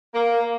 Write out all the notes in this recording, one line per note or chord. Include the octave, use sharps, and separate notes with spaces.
A#3